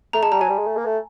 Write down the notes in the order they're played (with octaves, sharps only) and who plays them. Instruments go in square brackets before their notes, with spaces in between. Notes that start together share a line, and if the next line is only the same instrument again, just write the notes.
[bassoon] A3 [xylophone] A#5
[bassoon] G#3 [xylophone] A5
[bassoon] G3 [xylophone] A#5
[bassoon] F#3 [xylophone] G#5
[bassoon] G3
G#3
A3
A#3
A3